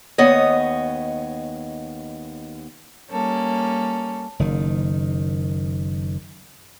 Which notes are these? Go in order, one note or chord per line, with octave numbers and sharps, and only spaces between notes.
D#2 B3 C#5 D#5
G3 A#3 C#4 A4
F#1 D#3